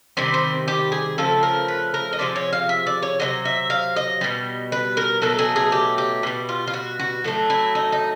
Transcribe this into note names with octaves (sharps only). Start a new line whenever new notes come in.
C3 D#3 G3 C4
C4
G4
G#4
C#3 F3 A3 A4
A#4
B4
A#4
D#5
C3 F3 G#3 D5
C#5
F5
E5
D5
C#5
C3 D#3 F#3 D#5
E5
F5
D#5
B2 G3
B4
A#4
B2 F#3 A3 A4
G#4
G#4
G4
G4
B2 G3
F4
F4
F#4
F#4
A2 F#3 A3
E4
D#4
D#4